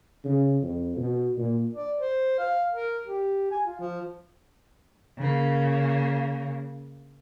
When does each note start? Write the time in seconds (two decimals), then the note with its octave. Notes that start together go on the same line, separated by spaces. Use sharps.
0.24 C#3
0.63 F2
0.96 B2
1.38 A#2
1.75 D5
1.99 C5
2.39 F5
2.72 A#4
3.05 G4
3.51 G#5
3.66 F4
3.80 F3
5.18 C#3 A#3